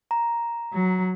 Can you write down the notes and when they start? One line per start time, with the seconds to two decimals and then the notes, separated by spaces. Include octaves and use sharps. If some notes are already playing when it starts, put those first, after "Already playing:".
0.11 A#5
0.73 F#3